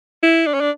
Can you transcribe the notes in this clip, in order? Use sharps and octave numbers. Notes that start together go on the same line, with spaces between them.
E4
D4
C#4
D4